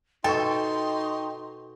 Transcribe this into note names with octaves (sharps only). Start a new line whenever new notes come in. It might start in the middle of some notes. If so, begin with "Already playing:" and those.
B2 D#4 A4 G5 C6 C#6